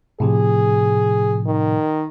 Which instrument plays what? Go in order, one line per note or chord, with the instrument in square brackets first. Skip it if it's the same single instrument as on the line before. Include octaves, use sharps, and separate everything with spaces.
[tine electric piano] A2 C3 F3 [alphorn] G#4
[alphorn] D#3